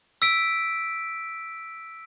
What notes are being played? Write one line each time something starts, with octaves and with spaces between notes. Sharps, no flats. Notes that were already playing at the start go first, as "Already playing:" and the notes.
E6 B6 D7